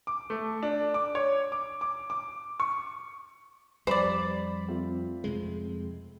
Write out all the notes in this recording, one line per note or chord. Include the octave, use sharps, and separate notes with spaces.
D6
A3
D4
D6
C#5
D6
D6
D6
C#6
F2 G3 C5 D5 B5
A3 C4 F4
F2 C3 G#3